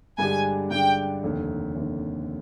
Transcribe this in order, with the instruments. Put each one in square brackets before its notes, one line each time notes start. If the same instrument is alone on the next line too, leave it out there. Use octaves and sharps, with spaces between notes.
[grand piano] G2 D3 G#3 D4 G4 [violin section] G#5
[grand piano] G2 D3 G#3 D4 G4 [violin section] G5
[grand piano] F1 D#2 D3
F1 D#2 D3